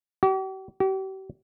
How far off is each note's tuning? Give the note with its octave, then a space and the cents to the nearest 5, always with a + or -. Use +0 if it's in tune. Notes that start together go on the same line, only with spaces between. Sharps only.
G4 -45
G4 -40